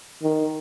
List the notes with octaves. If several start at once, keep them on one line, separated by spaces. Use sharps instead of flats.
D#3